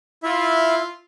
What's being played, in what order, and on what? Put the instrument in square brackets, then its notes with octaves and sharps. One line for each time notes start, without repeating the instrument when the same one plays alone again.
[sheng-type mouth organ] E4 E5 [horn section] F4